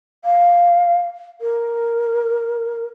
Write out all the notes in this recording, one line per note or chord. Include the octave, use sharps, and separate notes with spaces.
F5
A#4